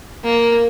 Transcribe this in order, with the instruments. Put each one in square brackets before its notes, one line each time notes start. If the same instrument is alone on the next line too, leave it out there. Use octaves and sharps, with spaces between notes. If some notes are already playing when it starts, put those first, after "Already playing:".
[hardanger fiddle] A#3